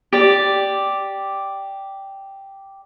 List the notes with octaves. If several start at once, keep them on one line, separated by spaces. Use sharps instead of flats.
G4 D5